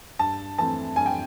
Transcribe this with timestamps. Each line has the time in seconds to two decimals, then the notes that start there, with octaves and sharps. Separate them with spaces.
0.19 G2 A5
0.58 E3 A3 C4 A5
0.96 G2 G#5
1.06 G5